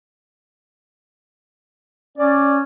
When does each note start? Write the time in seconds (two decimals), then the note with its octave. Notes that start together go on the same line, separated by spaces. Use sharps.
2.18 C#4 D5